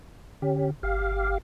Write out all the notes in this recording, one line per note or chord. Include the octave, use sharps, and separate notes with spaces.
D3 C#4 G4
G1 G4 F5